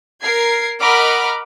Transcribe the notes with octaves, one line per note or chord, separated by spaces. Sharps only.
A#4 G#6 C7
A#4 D#5 F#5 B5 D6 F6